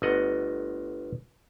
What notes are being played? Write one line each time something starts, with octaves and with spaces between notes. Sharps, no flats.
G1 A3 B3 D#5 F#5 A#5